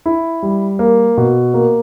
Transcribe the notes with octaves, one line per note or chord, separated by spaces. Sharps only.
E4
G3
A#3
B2
A#3